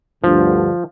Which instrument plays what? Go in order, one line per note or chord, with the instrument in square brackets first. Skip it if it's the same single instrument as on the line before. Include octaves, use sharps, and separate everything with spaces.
[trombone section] D2 G2 D3 [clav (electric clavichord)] F3